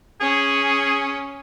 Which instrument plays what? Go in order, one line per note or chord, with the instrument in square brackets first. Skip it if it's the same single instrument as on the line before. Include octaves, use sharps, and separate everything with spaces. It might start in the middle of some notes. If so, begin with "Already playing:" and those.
[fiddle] C#4 [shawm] G#4